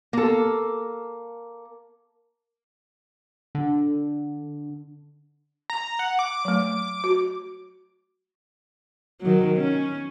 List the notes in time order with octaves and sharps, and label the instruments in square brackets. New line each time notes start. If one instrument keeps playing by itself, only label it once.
[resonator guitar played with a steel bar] A#3 A4
[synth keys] D3
[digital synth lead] A#5
F#5
D6
[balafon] F#3 A3
F#4
[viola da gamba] D#3 F#3
C#4